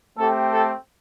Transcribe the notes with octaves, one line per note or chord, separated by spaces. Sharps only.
A3 C4 G4 A4
A4